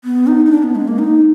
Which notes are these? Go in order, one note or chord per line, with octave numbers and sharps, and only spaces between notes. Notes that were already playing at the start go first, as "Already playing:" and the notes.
B3
D#4
D#4
D4
B3
G#3
A#3
D#4